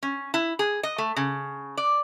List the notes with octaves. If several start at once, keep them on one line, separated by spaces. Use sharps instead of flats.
C#4
E4
G#4
D#5
A3
C#3
D5